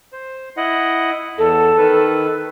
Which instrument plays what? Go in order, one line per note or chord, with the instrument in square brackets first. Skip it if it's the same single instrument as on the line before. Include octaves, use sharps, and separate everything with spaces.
[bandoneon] C5
E4 D#5 F#5
[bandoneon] E2 [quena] A4
[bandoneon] D#3 B4